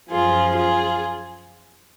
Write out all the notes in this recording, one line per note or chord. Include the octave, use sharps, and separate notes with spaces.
F#2 F3 F4 G#4
F4 G#4